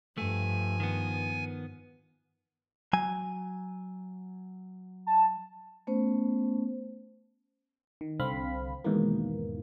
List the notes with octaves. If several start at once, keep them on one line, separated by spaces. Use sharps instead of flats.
G2 F3 A3 G#5
D#3 B3
F#3 G#5
A5
A3 B3 C#4 C5
D#3
C2 D3 C4 F5 B5
E2 G#2 B2 D#3 E3 A#3